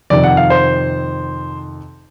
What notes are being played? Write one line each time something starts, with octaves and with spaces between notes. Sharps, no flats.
F2 C3 D#3 D5
F#5
F5
C5